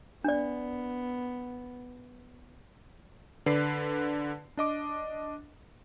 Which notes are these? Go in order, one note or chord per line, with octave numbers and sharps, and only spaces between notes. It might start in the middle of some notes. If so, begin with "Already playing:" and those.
B3 D4 D5
D3 B4 D5 C7
D4 D#5 D6